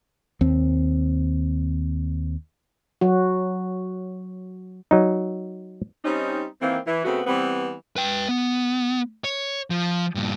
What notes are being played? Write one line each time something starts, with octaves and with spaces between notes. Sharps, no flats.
D#2 C4
F#3 F#4
F#3 D#4
G3 C4 C#4 D#4
D#3 E3 A#3 C4
E3
C#3 A3 B3 C4 F#4
E3 G3 B3 C4
B4 G5
B3
C#5
F3
G2 A#2